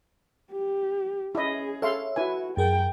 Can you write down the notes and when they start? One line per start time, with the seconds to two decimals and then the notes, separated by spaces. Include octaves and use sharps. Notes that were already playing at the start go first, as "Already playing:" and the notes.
0.52 G4
1.35 C#4 E4 G#4 D#5
1.82 A4 C#5 E5 F5 C6
2.16 E4 F#4 B4 G#5
2.57 F#2 G#4 A#4 G5